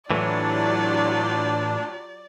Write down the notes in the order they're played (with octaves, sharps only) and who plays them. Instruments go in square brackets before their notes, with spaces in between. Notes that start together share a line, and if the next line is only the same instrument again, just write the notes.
[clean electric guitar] A2 E3 [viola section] F#3 F4 G4 [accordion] D4 [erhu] D5